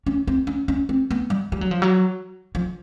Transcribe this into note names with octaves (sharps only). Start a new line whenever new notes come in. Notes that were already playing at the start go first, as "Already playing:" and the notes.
C#4
C4
C#4
C#4
C4
B3
G3
G3
F#3
F3
F#3
F3